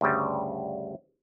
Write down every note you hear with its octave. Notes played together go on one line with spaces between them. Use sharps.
D2 G2 C#3 G3